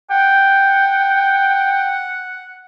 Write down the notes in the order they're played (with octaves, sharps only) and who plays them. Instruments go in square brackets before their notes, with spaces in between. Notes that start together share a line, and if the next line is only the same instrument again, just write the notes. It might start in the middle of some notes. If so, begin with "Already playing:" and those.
[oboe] F#5 [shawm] G5